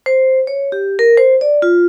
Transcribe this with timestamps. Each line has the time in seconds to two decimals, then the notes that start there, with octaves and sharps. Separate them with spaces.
0.06 C5
0.47 C#5
0.72 G4
0.99 A#4
1.17 C5
1.41 D5
1.62 F4